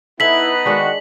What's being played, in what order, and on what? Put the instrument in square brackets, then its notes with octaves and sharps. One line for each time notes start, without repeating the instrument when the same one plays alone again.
[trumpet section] B3 D#4 B4 [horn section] E4 [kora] A4 E5 [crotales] B6 F#7
[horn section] D#3 F#4 [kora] G#3 D4